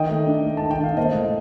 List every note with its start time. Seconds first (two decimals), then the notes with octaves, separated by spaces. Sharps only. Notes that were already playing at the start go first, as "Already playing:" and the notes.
Already playing: D#3 D#5 G5
0.09 A3
0.26 D4
0.45 A3
0.57 D#3 A5
0.71 G5
0.80 D#3 F5
0.97 A#3 C5 D#5
1.15 A2